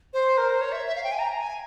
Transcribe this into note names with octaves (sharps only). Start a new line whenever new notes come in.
C5
A#4
C5
C#5
E5
E5
F5
G5
G#5
A#5
G#5